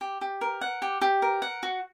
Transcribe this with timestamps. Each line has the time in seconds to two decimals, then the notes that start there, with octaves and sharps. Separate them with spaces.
0.01 G4
0.21 G4
0.41 A#4
0.61 F#5
0.82 G4
1.01 G4
1.22 A#4
1.42 F#5
1.63 F#4